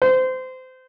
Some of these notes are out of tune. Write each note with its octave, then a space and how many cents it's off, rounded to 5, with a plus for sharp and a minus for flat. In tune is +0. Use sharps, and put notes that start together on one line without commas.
C5 -25